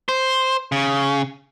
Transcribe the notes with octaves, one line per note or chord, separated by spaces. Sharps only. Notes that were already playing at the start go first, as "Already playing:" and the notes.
C5
C#3